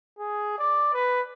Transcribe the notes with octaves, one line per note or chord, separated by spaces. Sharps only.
G#4
D5
B4